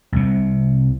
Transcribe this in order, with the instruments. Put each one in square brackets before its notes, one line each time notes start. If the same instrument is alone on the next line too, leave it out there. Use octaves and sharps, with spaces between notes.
[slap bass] C2 C3